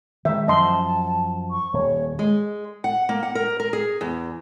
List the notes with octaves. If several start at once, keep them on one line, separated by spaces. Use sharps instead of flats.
D#3 G#3 E5
F#2 F3 D#5 A5 C6
C#6
D#1 C#5
G#3
F#5
A#3
F#5
A#4
A#4
G#4
E2